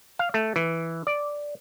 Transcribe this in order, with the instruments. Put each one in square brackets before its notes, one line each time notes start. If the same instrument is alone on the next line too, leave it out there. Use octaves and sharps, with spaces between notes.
[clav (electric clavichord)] F5
A3
E3
D5